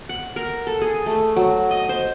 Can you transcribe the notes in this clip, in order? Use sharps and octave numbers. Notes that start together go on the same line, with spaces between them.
F#5
A#4
A4
G#4
A3
F#3
D#5
C5